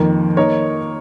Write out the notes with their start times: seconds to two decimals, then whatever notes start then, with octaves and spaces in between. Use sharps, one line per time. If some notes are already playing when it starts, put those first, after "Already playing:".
Already playing: F2 D#3 A#3
0.37 A#3 D#4 A#4 C#5